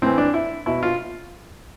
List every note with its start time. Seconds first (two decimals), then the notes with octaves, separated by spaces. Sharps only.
0.02 A2 E3 C4
0.18 D4
0.34 E4
0.66 B2 E4
0.83 F4